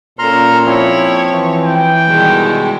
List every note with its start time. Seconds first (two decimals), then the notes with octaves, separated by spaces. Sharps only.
0.19 A#2 C#4 A4 A#5 C6 F6
0.65 F3 C4 E4 C#5
1.33 E3
1.65 E4 G5
2.08 B2 D#3 G3 G#3 E4